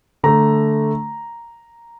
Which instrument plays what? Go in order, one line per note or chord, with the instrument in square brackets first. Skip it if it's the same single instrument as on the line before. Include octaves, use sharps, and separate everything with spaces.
[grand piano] D3 A3 A#5